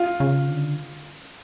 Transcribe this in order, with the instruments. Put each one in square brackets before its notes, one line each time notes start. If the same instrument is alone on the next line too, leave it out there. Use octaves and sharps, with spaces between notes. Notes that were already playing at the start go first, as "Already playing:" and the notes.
Already playing: [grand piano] F4
[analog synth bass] C#3
D3